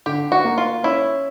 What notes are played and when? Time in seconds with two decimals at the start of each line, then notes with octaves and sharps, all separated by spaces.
0.06 D3 G4
0.32 F#4
0.45 A#3
0.58 F4
0.83 C#4 E4